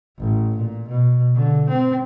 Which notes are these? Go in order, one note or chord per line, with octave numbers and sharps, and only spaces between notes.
A1
A#2
B2
D3
C4